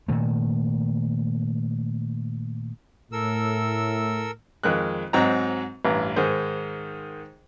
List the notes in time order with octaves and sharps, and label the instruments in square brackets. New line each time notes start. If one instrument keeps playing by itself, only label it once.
[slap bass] A#2 D#3 A3
[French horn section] A2 [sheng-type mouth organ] A4 A#4 E6
[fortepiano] F2 D#3 G#3 F#6
G#2 F#3 C4 D#4 A#5
A1 G2 A#5
G#2 D#3 G#4 C5